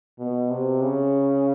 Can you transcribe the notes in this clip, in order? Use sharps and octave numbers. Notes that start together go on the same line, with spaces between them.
B2
C3
C#3